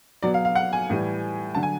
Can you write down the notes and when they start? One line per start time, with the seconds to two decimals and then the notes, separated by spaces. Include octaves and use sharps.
0.23 B2 F#3 D5
0.34 F5
0.45 F5
0.55 F#5
0.73 G#5
0.90 A2 E3 G3
1.55 D3 F#3 A5
1.63 G#5